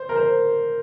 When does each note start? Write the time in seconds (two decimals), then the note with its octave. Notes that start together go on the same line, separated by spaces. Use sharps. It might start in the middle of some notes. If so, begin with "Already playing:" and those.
Already playing: C5
0.09 A#4
0.16 C5